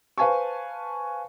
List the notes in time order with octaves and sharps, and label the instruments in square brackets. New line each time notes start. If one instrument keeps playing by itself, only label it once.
[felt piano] B4 C5 F5 G#5 A5 C#6